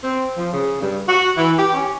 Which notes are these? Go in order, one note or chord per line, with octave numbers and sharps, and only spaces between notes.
C4
F3
C#3
G2
F#4
E3
G4
C#4